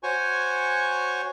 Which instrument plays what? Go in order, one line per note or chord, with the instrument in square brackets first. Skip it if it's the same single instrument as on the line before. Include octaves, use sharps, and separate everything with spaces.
[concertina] F#4 C5 C#5 G#5 C#6